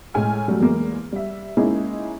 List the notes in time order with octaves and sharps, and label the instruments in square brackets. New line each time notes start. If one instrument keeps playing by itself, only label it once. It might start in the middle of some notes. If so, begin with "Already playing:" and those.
[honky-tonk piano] A2 G#3 G#5 F6
F#3 G3 A3
E2 G#3 A#3
G3 E5
G#3 A#3 C#4 D#4 E4 G#4